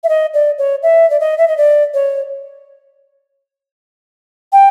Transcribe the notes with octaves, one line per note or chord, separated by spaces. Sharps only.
E5
D#5
D5
C#5
E5
D5
D#5
E5
D#5
D5
C#5
G5